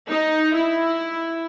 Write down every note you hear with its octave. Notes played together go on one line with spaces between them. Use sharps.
D#4
E4